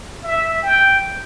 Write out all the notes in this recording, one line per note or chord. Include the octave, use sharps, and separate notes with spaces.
E5
G5